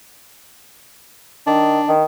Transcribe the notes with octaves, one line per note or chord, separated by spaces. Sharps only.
D#3 D4
D#3